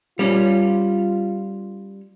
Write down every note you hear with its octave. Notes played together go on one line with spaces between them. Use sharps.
G3 C#4 F4